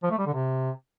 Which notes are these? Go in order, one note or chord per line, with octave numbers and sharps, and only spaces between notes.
F3
A3
G3
D3
C3